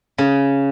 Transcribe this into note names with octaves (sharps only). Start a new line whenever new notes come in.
C#3